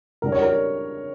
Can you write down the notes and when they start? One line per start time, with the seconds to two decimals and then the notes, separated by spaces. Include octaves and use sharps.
0.22 C#3 G3 D4 A#4
0.32 C#5
0.42 A#4